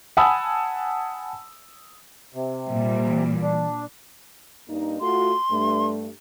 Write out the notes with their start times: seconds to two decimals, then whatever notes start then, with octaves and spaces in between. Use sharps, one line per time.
0.17 F#5 G#5 A5 B5 D#6 E6
2.35 C3
2.69 A#2 G3
3.05 E3
3.42 D4
4.68 G2 A#3 D#4
5.01 A3 F4 F#4 C6
5.50 G2 A3